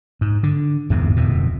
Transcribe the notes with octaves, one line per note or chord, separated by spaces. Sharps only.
G#2
D3
G1 E2 G#2 C3
D1 F2 B2